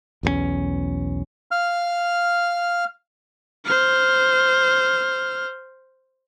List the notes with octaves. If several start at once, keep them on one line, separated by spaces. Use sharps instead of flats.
B1 E2 G3 C#4
F5 F6
C5 F6